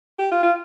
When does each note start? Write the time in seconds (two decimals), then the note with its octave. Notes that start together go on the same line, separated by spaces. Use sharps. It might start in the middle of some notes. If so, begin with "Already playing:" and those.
0.19 G4
0.31 F4
0.43 F4